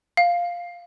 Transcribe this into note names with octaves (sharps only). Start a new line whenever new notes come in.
F5